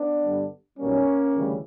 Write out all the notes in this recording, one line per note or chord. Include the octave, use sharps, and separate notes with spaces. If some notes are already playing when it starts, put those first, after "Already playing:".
Already playing: B3 D4
G2 D3 G3
B1 B2 G3 A#3 C#4
D2 C#3 E3 G3